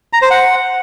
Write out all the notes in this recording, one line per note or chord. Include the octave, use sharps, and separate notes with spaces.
A#5
C5
F#5